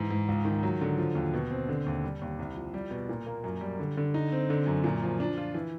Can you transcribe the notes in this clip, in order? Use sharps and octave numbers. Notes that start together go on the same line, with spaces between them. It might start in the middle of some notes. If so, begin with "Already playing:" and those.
Already playing: G#2 E3
G#2
C#2
D#3
F#3
D3
F3
D#2
B2
C4
D3
D#2
G3
D#2
C2
F3
G3
B2
A#2
A#3
F#2
G3
D3
D3
D#4
C4
D3
F#2
A#2
F3
D4
F4
E3